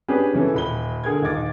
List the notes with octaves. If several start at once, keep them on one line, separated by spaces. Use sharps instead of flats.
C#4 D4 G4 G#4 B4
C#3 E3 C#4 A4
D#1 B5 G7
D3 G#4 A#4 G#6
D#1 D#2 D#4 D6 A6